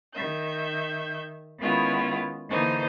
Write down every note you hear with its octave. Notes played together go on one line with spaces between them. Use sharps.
D#3 E5 G6
D#3 G#3 B3 C#4 E4 F4
D3 E3 A#3 D#4 C5